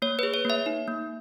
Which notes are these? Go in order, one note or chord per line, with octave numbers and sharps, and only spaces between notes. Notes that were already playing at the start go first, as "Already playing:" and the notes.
A#3 C#5
G#4 B4
C#5
A#3 E5
D#4
A#3